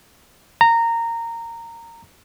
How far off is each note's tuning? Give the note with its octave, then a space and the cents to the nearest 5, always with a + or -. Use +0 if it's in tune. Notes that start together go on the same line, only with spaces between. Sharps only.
A#5 -15